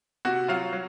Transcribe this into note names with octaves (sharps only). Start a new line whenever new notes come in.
C3 F#4 F#5
F#3 F4 F5
F#3